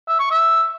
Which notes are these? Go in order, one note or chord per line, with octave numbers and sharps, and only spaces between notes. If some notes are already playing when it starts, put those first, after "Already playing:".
E5
C#6
E5